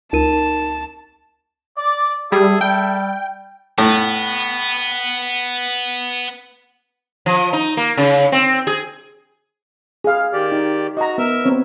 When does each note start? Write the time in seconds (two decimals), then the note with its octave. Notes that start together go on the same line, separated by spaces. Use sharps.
0.13 C#2 D#4 A#4 A5 D#7
1.77 D5
2.32 G3 G#4 A4 E5
2.61 G3 G5
3.78 A2 B3
7.26 F3
7.53 D#4
7.77 A#3
7.97 C#3
8.32 C4
8.67 G#4
10.04 G#4 F5
10.33 D#3 G4 D5
10.52 D#4
10.97 F#4 D#5 A#5
11.18 B3 A#4 E5
11.45 B3 C4 C#5